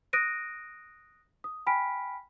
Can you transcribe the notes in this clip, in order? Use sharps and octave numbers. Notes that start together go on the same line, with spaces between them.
D#6 F#6 A#6 D7 D#7
D#6
G5 G#5 B5 F6 B6 D7